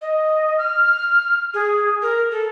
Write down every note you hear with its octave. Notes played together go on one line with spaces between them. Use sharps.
D#5
F6
G#4
A#4
A4